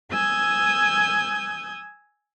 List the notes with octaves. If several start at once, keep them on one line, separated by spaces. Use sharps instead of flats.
G#5 D#6 E6 G6 G#6